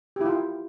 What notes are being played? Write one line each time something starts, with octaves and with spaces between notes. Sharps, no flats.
E4 F4 G4